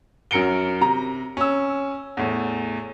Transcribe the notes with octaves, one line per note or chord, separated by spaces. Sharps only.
F#2 F#3 A#4 C#7 D7 G7
C3 A#5
C#4 E6
E2 A2